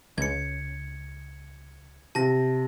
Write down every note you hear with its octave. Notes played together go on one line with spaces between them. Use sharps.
C#2 G#6 C#7
C3 A5 A#6